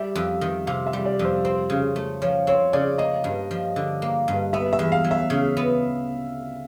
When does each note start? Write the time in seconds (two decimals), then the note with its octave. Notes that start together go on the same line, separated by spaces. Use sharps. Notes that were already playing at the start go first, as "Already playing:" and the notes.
Already playing: G3 E5
0.15 F2
0.41 D#3
0.67 C3 F5
0.87 E5
0.93 G3
1.05 D5
1.19 F2
1.25 C5
1.44 C4 C5
1.70 C#3
1.96 A3
2.22 F3 C#5
2.47 C4 C#5
2.73 C#3 D5
2.98 A#3 D#5
3.24 G2
3.51 F3
3.76 D3
4.02 A#3
4.28 G2
4.53 B3 E5
4.73 E5
4.79 E2
4.92 F5
5.04 F#3
5.11 E5
5.30 C#3
5.57 B3